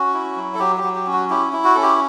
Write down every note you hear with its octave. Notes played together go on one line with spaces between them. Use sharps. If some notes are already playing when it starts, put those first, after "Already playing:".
Already playing: C#4 F#4
E4
F#3
A4
F#3 G4
G4
F#3
G4
C#4
F#4
E4 G4
E4
F#4
C#4 A4
G4